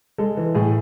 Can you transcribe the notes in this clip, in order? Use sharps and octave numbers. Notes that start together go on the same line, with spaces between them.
G#3 A4
E3
A2 G#4